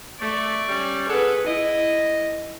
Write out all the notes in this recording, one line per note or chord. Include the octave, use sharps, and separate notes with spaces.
A3 D5 C#6
G3 C#4
G#4 A4 B4 F#5
E4 D#5